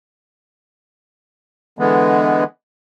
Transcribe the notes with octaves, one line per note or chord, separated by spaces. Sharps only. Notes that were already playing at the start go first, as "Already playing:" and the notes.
D3 E3 G#3 B3